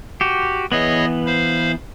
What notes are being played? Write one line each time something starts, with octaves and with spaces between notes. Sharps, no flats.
F#4 G4
E3 B3 G#4 C#5 D#5
C5 F5 B5